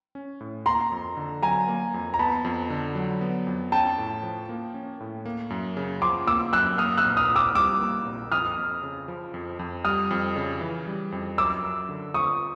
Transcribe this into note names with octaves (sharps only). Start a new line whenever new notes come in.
C#4
A2
A#3 A#5 C6
F2
D3
F#3 G#5 A#5
A#3
F2
A#5
B3 A5 B5
F2
D3
F#3
B3
F2
C#4 G5 A5
A2
F3
A#3
C#4
A2
A#3
F#2
C#3
F3 C6 D6
A#3 D6 E6
F#2 E6 F#6
A#3 D#6 F6
E6 F#6
A#1
D#6 F6
A#2
D6 E6
G3 D6 E6
A#3
A#1
F2 D#6 F6
F2
C#3
F3
F2
F2
G3 D#6 F6
F2
C#3
E3
G3
F2
F#2 D6 E6
F#2
D3
F3 C#6 D#6